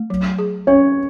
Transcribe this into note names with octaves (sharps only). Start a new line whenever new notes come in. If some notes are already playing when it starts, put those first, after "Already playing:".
Already playing: A3
F#3
G#4
C#4 C#5